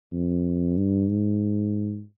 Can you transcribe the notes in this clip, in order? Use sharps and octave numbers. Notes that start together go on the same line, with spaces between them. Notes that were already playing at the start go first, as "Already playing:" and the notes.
F2
G2
G#2